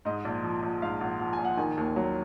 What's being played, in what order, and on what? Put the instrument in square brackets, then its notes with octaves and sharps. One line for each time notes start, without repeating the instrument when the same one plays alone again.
[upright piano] G#2 D#5
A#1
F3
A#1
G#2 F5
A#1 F#5
F3 F#5
G#5
A#1
F#5
D#3 G#5
D#2
F#3